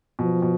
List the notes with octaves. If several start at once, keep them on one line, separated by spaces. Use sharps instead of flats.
B2 F3
B2